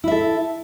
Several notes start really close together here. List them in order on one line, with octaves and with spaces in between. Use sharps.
E4 E5 A4